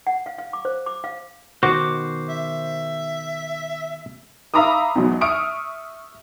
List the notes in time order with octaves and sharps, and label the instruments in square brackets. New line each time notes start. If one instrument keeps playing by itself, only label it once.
[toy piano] F#5
F5
F5
D6
C5
D6
F5
[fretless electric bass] B2 D#3 [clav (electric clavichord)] F#4 [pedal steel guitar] C5 D6
[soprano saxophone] E5
[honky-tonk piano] E5 F5 A#5 B5 D6 D#6
E2 G#2 B2 F#3
E5 C#6 D#6 F6 D7